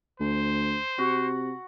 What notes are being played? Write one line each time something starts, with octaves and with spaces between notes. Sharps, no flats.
D2 C5
C3 F#4